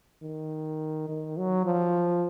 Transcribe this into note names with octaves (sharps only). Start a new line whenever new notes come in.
D#3
D#3
F#3
F3